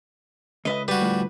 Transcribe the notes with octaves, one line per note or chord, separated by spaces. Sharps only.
C#2 B4 D#5 E5
G3 F#4 B4
D2 A2 F3